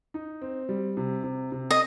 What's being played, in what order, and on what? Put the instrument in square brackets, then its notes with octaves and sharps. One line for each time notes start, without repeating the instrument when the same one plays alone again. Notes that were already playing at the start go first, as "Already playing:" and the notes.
[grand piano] D#4
C4
G3
C3
C3
C3
[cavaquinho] D#5